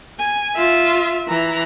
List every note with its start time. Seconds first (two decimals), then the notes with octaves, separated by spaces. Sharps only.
0.19 G#5
0.56 F4 E5
1.28 E3 A#5